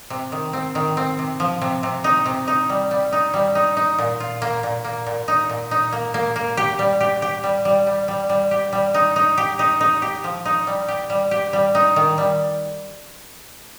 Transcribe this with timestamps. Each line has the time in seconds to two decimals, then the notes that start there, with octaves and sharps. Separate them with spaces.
0.10 C3
0.32 D#3
0.53 C4
0.75 D#3
0.97 C4
1.19 C3
1.40 F3
1.62 C3
1.83 C3
2.04 D#4
2.26 C3
2.48 D#4
2.69 G3
2.91 G3
3.12 D#4
3.34 G3
3.55 D#4
3.77 D#4
3.98 A#2
4.20 F4
4.42 A#3
4.63 A#2
4.84 A#3
5.07 A#2
5.28 D#4
5.49 A#2
5.71 D#4
5.92 A#3
6.14 A#3
6.36 A#3
6.57 G4
6.79 G3
7.00 G4
7.22 G4
7.44 G3
7.65 G3
7.87 G3
8.08 G3
8.30 G3
8.51 G4
8.73 G3
8.94 D#4
9.16 D#4
9.38 G4
9.59 D#4
9.81 D#4
10.02 G4
10.24 F3
10.45 D#4
10.67 G3
10.88 G4
11.10 G3
11.31 G4
11.53 G3
11.75 D#4
11.96 D#3
12.18 G3